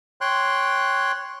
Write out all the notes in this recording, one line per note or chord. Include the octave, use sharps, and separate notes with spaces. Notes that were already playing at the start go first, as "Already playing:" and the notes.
C#5 G5 C6 F#6